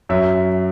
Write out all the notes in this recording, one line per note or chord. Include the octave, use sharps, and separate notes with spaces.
F#2 E5